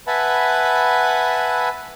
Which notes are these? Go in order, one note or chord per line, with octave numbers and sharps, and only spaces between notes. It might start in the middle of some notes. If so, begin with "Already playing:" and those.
B4 E5 F#5 G#5 A5 B5